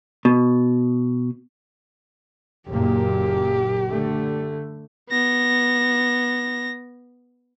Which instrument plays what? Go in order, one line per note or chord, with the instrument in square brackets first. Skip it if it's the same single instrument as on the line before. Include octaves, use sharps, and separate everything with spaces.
[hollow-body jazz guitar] B2
[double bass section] F#1 A#2 A#3 [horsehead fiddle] G4
[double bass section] D3 A3
[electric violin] B3 A#6